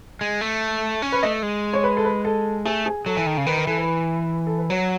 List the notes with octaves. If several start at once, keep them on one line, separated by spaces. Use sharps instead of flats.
G#3
A3
C#4
B4
A3 D#5
G#3
C#5
B4
A4
B4
A4
A3 G#4
G#4
F#3 A4
E3
D#3
C#3
D#3 B4
B4
E3 A4
B4
A4
B4
F#3 C#5